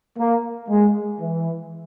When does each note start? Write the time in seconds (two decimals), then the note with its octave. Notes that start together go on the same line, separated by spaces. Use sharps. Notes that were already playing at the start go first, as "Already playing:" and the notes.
0.18 A#3
0.69 G#3
1.20 E3